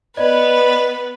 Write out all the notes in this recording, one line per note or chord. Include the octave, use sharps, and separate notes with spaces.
B3 B4 D5 D#5